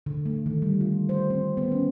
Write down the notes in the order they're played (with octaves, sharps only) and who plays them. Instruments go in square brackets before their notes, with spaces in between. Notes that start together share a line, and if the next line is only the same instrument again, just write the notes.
[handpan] D3
A3
D#3
G3
F4
C5
C4
B3
C#4